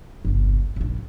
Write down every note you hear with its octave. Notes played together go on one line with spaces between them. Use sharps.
G1 C2
A#1 G#2